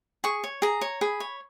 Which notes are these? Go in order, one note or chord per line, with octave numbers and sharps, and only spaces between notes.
G#4 C#6
C#5
G#4 A#5
C#5
G#4 B5
C#5